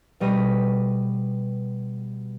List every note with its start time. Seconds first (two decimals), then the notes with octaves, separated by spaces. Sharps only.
0.20 B2 G3 D#5 B5